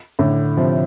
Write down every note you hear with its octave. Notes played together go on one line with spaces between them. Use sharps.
A2 D3
C3 F3